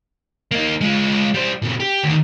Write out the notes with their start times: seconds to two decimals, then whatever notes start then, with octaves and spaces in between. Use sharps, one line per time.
0.52 A#3 D#4
0.81 G#3 F4
1.34 G3 C5
1.62 A#2 C#3
1.80 G4
2.03 D2 D#3